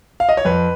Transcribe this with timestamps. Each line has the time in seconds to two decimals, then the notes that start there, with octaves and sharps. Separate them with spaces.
0.20 F5
0.29 D#5
0.37 C#5
0.45 F2 B4